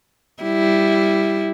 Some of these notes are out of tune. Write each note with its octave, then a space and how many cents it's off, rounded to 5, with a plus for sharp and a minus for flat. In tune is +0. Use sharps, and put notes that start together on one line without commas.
G3 +0 E4 +0